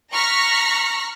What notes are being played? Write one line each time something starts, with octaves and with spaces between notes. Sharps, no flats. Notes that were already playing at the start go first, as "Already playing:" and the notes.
A#5 C#6 F6 F#6 A#6 B6